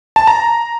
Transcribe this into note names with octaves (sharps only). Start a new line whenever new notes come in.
A5
A#5